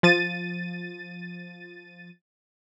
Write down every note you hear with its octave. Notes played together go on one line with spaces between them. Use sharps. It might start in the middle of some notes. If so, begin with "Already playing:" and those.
F3 A6 D#7